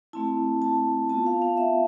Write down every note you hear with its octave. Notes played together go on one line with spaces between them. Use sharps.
A3 C4 E4 A5
A5
B3 F4 A5
F5
F5
E5